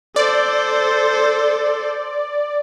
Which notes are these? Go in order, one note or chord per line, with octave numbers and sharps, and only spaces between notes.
A4 C5 D5